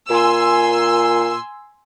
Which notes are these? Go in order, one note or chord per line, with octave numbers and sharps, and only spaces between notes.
A#2 G#5 C6 E6